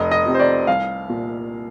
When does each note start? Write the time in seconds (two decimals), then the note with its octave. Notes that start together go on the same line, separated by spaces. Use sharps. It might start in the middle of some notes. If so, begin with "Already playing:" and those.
Already playing: F1 D#5
0.11 D#5
0.26 F2 C3
0.34 C5
0.40 D5
0.67 C2 F5
1.10 A#2